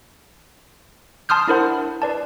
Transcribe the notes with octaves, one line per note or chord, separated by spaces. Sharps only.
A5 C6 D#6 F6 G6
D4 E4 A#4 C5 F#5
B4 D5 A5